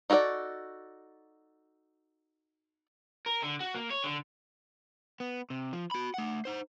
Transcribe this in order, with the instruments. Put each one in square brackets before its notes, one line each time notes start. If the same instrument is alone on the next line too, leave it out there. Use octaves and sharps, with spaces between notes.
[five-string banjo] D#4 F#4 A4 A#4 D5
[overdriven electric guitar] A#4
D3
F#4
A#3
C#5
D3
B3
C3
F3
F#4 B5
A3 F#5
D#4 C5